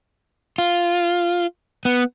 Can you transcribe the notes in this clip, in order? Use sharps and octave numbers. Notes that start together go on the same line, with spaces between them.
F4
B3